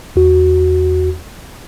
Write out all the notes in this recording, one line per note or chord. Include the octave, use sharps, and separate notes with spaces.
E2 F#4